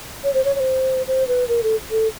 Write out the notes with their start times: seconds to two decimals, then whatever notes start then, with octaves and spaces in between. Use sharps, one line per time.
0.24 C#5
0.34 C5
0.45 C#5
0.55 C#5
0.60 C5
1.08 C5
1.28 B4
1.48 A#4
1.63 A4
1.91 A4